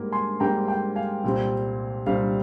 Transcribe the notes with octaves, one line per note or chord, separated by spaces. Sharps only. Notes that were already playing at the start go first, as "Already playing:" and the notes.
Already playing: G#2 G3 A#3
G#5 C6
G#2 G3 A#3 G5 A#5
G5
F5 G#5
C2 A#2 G3 C4
C2 A#2 G3 C4 F5